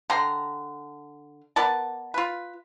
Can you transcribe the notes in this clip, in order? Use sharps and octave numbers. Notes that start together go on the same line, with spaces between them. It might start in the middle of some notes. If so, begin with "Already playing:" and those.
D3 G5 A#5 C6
B3 A#4 D5 A5
F4 B4